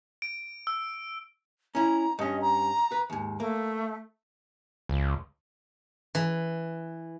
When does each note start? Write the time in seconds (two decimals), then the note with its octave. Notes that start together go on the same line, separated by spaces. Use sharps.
0.22 D7
0.67 E6
1.75 C#4 E4 A#5
2.19 G2 C#4 D#5
2.41 A#5
2.92 B4
3.10 D#2 G#2
3.40 A3 A#3
4.89 C#2
6.15 E3